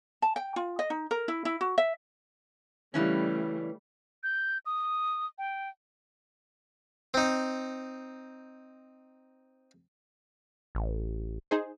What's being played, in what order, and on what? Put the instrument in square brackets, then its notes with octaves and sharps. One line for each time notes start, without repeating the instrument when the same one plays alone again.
[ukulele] A5
G5
F4
D#5
D#4
A#4
E4
E4
F#4
E5
[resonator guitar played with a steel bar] C#3 E3 C#4 [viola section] G3 A3
[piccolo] G6
D#6
G5
[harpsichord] C4 D#4
[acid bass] A1
[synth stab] D#4 G#4 C5